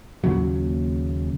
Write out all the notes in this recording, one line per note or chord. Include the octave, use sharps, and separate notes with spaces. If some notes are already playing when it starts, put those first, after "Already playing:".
D#2 A#2 C#3 F#3